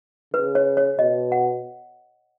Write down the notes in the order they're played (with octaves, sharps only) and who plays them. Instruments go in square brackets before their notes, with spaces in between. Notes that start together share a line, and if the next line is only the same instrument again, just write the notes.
[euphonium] C#3 [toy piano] B4
[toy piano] C#5
C#5
[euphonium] B2 [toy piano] D#5
[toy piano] F#5